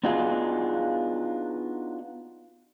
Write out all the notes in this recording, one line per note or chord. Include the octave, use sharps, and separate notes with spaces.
B3 D4 D#4 F4 F#4 G#4